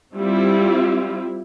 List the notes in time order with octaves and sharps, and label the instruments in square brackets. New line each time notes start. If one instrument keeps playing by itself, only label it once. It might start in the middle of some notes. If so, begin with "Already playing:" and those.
[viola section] G3 C4 E4 F4